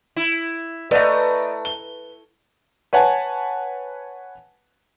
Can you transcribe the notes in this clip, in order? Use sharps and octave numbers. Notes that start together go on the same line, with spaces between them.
E4
A3 B4 D5 D#5 A#5
G7
B4 C#5 F#5 G#5 A5